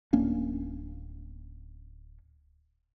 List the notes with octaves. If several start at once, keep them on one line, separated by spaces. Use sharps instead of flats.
D1 A#3 C#4 D4